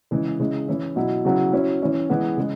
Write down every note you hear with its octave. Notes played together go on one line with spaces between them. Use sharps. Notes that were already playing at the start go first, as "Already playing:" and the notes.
C#3 E3 G#3
C#3 G#3 E4
E3 C#4 E4
B2 F#3 E4
C#3 F#3 B3 E4
F#3 C#4 E4
E3 C#4 E4
E3 G#3 B3
C#3 G#3